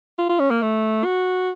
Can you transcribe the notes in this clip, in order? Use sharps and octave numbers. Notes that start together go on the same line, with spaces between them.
F4
F4
C#4
A#3
A3
F#4